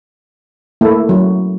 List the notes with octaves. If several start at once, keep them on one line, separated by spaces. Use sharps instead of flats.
A3 A#3 E4 A4
F#3